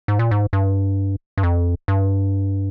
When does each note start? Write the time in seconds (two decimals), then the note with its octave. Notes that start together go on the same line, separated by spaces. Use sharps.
0.08 G#2
0.19 A#2
0.31 G#2
0.53 G2
1.38 G2
1.43 F2
1.88 G2